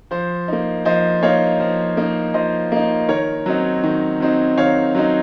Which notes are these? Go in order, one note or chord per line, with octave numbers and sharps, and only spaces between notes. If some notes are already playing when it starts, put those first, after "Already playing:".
F3 C5
A#3 D#4
F3 C5 D#5
A#3 D#4 C#5 F5
F3
A#3 D#4
F3 C5 D#5
A#3 D#4
D#3 A#4 C#5
F#3 C4 D#4
D#3
F#3 C4 D#4
D#3 C#5 F5
F#3 C4 D#4